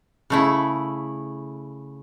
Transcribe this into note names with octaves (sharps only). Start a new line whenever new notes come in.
C#3 A3 E4